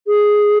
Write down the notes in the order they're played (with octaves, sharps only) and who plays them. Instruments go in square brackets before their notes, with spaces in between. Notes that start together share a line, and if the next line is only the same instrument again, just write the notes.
[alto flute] G#4